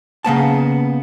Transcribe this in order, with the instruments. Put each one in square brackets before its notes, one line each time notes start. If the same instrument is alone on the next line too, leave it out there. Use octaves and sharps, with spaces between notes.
[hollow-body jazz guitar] C#3 A#3 B3 A5